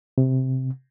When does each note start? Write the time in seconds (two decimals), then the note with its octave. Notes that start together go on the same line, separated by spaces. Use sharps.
0.18 C3